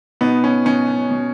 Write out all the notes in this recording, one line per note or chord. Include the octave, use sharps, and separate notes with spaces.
B2 B3 D#4
C#4
B2 C#4
B2